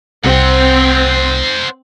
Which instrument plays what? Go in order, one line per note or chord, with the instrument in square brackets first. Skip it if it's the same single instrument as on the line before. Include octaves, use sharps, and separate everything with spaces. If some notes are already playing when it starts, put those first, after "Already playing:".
[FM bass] C2 [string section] C4 [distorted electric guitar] C5 F#5